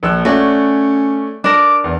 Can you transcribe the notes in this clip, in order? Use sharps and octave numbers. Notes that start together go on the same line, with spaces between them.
A#1 F3 E6 F#6
A3 C#4 F#4 C#5 D5
D4 A#4 D6
E2